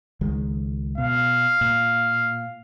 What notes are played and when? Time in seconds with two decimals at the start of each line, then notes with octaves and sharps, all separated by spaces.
0.21 C#2 D#3 G#3
0.98 B2 F5
1.61 A#2